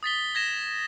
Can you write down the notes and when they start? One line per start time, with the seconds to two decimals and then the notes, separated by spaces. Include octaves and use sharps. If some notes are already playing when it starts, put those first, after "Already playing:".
0.03 D#6 A6 B6 G7
0.35 G#6 A#6 E7